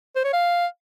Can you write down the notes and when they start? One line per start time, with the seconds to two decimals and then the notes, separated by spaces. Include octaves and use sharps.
0.16 C5
0.25 C#5
0.33 F5